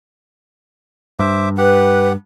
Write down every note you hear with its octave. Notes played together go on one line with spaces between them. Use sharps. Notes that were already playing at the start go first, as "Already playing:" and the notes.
G2 C5 E5 D6
G4 B4 F#5